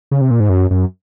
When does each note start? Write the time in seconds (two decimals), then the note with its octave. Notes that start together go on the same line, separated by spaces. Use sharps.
0.11 C#3
0.21 C3
0.31 A#2
0.40 G#2
0.49 F#2
0.71 F#2